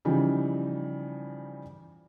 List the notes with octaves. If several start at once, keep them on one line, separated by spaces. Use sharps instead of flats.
C#3 E3 F3 G3 D#4